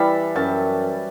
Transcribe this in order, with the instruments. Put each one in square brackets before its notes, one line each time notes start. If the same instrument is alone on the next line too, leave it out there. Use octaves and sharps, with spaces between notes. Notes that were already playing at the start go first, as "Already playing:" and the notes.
Already playing: [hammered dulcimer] E3 G3 A5 B5
F#2 A5